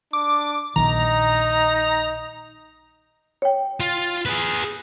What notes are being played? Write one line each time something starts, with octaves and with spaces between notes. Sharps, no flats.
D4 D6
A#1 D#3 D#4 A#5
C#5 G5
F4
G#4 B4